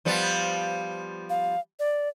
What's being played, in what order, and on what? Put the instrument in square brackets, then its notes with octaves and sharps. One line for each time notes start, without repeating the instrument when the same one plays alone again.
[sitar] F3 G3 B3
[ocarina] F5
D5